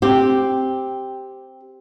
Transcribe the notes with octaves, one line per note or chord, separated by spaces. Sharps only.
C4 G4